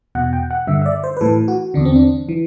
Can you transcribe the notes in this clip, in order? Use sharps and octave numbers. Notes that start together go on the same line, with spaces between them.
E2 B2 F#5
G5
F#5
G2 D3 E5
E5
D5
C5
B4
A2 E3 A4
F#4
E2 D3 D4
C4
D4
E3